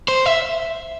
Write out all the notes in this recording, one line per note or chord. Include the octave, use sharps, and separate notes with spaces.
C5
E5